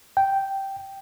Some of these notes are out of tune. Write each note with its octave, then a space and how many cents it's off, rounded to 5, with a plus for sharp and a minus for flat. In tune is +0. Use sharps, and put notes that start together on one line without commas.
G5 -5